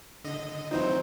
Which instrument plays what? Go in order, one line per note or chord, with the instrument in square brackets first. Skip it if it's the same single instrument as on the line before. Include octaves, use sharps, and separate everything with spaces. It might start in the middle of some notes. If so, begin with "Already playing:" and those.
[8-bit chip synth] D3 D#5
[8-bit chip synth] E3 F#3 C4 [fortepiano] D#4 C5